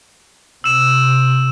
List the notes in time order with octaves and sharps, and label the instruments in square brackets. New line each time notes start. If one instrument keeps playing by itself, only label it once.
[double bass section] C3 [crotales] E6 E7